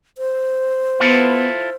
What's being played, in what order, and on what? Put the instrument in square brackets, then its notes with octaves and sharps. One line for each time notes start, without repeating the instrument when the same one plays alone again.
[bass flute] C5
[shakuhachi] B3 [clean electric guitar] E4 F4 A4